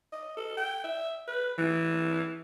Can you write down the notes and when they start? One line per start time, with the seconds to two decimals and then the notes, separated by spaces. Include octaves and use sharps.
0.13 D#5
0.37 A4
0.57 G5
0.84 E5
1.28 B4
1.58 E3